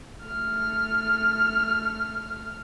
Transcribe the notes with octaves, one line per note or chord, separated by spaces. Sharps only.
A3 F6